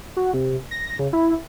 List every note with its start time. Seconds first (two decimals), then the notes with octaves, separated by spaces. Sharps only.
0.17 F#4
0.33 C3
0.71 A#6
0.99 C#3
1.13 E4